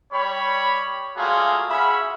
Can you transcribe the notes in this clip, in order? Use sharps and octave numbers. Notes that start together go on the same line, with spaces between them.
G3 C#5 B5
G3 A3 A#3 F4 F#4 G#4
C#4 G#4 E5 F#5 B5